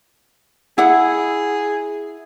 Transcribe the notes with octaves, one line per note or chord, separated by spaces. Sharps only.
E4 G#4 F#5